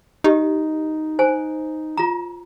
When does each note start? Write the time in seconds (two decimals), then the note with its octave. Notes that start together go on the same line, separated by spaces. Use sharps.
0.24 D#4 G4 D#5
1.19 C5 G#5
1.97 F4 A#5